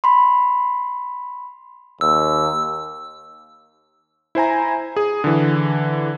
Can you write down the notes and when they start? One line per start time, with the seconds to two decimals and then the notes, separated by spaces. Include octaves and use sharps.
0.04 B5 C6
2.01 D#2 E6
4.35 E4 C5 G#5 A#5
4.96 G#4
5.24 D3 E3